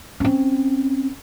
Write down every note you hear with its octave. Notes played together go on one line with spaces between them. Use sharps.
C4 C#4